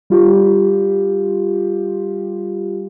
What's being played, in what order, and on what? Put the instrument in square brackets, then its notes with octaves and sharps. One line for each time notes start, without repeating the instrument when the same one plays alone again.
[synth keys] G3 F4 G4